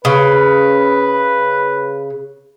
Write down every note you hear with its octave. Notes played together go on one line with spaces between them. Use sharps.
C#3 B4